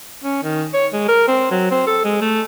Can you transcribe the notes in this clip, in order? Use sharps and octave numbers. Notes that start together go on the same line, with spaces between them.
C#4
D#3
C#5
G#3
A#4
C4
F#3
C4
A4
G#3
A3